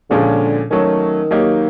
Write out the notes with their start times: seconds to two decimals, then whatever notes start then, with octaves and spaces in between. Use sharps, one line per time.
0.10 A#2 D3 F3 G#3 C#4
0.71 D#3 F#3 A3 C#4
1.31 F#3 A#3 D#4 G4